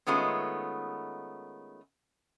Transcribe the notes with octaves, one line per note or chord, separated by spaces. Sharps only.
D#3 G#3 A3 B3 C#4 F4